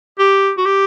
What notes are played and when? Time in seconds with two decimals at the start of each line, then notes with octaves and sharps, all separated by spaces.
0.19 G4
0.57 F#4
0.66 G4